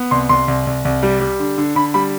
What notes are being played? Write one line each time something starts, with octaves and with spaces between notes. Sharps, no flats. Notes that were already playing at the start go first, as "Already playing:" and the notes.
Already playing: B3
C2 C6
C2 C6
C2
C2
C2
G3
G3
D3
D3
D3 B5
G3 B5